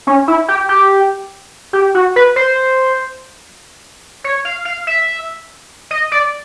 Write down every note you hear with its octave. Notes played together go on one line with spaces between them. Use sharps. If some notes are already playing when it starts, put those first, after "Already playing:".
C#4
E4
G4
G4
G4
F#4
B4
C5
C#5
F5
F5
E5
D#5
D5